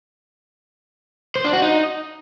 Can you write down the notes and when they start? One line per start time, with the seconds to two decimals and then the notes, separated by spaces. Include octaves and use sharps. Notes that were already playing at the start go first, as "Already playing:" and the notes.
1.36 C5
1.44 D4
1.53 F#4
1.62 D#4